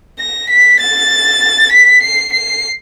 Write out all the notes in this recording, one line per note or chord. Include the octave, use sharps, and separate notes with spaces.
A#6
B6
A6
B6
C7
C7